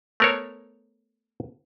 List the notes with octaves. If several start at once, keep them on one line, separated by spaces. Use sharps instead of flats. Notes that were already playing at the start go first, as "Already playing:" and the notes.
A3 B3 A#4 C5 C#5